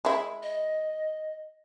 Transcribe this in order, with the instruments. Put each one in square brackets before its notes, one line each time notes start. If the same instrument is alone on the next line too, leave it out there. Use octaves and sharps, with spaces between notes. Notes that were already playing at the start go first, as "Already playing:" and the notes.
[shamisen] G#3 E4
[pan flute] D#5